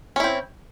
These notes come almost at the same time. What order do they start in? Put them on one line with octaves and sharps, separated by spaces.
C#4 E4 C4